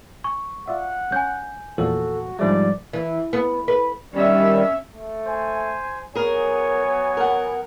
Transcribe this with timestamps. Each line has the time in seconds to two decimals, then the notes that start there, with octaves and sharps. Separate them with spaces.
0.24 G#5 C#6
0.68 F4 D5 E5 F#5
1.12 C#4 G#5 G6
1.78 E2 A#2 F3 F#4 A4
2.39 G#2 F3 G3 A3 D4 D5
2.93 E3
3.33 B3
3.68 B4
4.13 D#3 G3 C#4 E5
4.94 A3
5.27 C5 G#5
6.15 F#3 B3 G#4 A#4 C#5 G#5
7.17 A#4 F#5